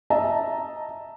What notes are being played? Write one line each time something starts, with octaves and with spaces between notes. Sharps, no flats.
D#5 E5 A5 A#5